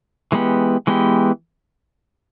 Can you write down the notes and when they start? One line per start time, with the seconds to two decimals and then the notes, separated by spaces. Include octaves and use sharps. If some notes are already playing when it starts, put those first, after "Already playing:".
0.32 E3 G#3 B3 G4
0.87 E3 G#3 B3 G4